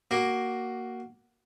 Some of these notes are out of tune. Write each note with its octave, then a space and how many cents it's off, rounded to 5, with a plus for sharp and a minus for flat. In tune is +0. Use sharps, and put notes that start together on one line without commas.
A#3 +0 F#4 +10 D6 +0